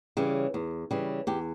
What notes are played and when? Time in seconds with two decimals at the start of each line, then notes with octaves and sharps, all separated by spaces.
0.17 C#3 E3 G3
0.54 E2
0.91 C#3 E3 G3
1.27 E2 G4